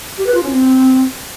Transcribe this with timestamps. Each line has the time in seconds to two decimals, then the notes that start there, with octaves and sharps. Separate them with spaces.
0.18 G4
0.26 B4
0.35 F4
0.43 C#4
0.51 C4